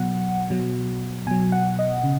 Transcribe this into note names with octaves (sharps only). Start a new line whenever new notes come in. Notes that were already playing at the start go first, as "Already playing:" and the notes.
Already playing: B2 F#3 F#5
B2 F#3
B2 F#3 G#5
F#5
D#5
C#3